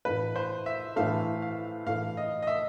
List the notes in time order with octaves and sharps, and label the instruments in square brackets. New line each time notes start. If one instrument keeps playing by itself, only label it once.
[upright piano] A2 E3 A3 [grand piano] B4
[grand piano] C5
E5
[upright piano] A2 E3 A3 [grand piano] F5
[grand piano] F5
[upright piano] A2 E3 A3 [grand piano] F5
[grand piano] D#5
D#5
E5